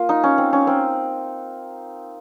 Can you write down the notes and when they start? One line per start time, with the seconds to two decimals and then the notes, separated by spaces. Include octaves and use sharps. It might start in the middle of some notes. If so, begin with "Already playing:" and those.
Already playing: A#3 F4
0.09 D#4
0.24 C#4
0.38 C4
0.53 C#4
0.67 C4